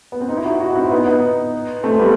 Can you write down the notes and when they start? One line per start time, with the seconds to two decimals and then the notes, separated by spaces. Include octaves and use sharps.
0.12 B3
0.21 C4
0.29 D#4
0.37 E4
0.45 D#4 F#4
0.60 D#4 F#4
0.72 F#4
0.75 C4 E4
0.91 B3 D#4
1.07 B3 D#4
1.83 A3 C4
1.99 G3 B3